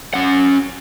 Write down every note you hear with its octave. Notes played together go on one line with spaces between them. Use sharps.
C#4 F#5